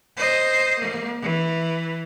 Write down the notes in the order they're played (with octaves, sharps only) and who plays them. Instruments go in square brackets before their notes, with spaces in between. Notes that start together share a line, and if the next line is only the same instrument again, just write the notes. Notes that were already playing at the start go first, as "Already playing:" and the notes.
[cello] C5 D#5
A#3
E3